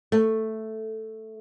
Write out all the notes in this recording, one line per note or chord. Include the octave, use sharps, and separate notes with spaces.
A3